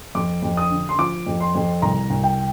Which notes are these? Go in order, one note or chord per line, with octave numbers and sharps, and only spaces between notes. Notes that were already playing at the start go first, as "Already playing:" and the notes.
F2 D6
F2
D#6
D3
C6
F3 D6
F2
C6
F2
C2 A#5
C2
G5